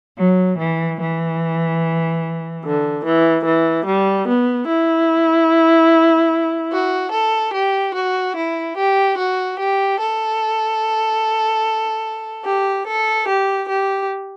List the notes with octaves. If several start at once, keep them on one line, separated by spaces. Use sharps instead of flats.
F#3
E3
E3
D3
E3
E3
G3
B3
E4
F#4
A4
G4
F#4
E4
G4
F#4
G4
A4
G4
A4
G4
G4